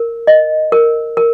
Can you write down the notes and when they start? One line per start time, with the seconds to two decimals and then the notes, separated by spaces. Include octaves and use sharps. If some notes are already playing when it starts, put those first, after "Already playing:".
Already playing: A#4
0.27 D#5
0.72 A#4
1.17 A#4